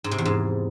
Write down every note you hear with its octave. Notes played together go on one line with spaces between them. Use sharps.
G#2
C3
E2
G#2